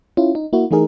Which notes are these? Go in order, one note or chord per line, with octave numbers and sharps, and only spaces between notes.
C#4 E4 F4
D#4
A#3 E4 F#4
E3 A3 D#4 G#4 A#4